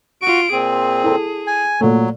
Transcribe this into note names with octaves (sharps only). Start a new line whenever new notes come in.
F4 F#4 C#6 D7
A#2 C4 G#4
E4 A4
G#5
A#2 F#3 A3